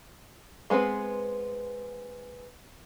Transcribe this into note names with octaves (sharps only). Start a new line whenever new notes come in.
G#3 B3 C4 B4